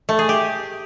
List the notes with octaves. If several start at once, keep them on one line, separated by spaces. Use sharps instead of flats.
A3
G#4
G4